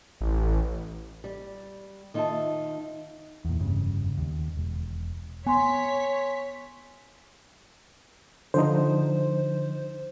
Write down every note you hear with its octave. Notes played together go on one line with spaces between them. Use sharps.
A1
G3
D#3 D#4 F4 C#5 E5 A5
E2 A#2
F1 G2 C#3
D#2
E1
B3 C#5 G#5 C6 B6
D3 F3 D#4 C5